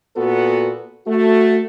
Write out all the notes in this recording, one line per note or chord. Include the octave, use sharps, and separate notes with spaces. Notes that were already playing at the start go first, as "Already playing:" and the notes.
A#2 B3 F#4 A4 B4
A3 F#4